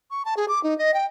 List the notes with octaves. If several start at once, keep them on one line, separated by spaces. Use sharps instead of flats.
C#6
A5
G#4
D6
D#4
D#5
G5